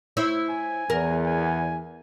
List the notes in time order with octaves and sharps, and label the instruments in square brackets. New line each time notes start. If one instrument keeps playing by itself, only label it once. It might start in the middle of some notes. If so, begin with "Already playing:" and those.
[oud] E4 C5 C#5
[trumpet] G#5
[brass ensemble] E2 [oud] A#4
[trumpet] G#5